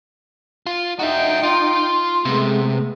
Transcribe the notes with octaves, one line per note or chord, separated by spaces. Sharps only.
F4
D#4 F#4 E5 G5
F4 C6
C3 G#3 A3 B3